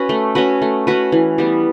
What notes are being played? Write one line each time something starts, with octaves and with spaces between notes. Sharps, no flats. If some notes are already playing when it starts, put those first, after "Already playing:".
Already playing: C#4 F#4 B4
A3
C#4 F#4 B4
A3
C#4 F#4 B4
E3
G3 B3